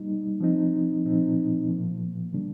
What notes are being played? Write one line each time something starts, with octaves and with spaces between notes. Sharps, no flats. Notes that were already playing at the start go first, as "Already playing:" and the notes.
Already playing: G3 A#3 D#4
F3 C4 D#4
A#2 F3 C4 D#4
A#2 F3 A#3
D3 G3 A#3 D4